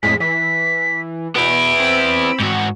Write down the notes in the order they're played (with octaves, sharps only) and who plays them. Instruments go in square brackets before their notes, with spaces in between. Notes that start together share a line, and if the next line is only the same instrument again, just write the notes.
[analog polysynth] F2 A2 G#3 [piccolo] B6
[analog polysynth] E3 [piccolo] B6
[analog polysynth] B2 [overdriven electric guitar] B3 E4 [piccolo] D7
[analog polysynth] C4 B5 E6
[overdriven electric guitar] G#2 F#4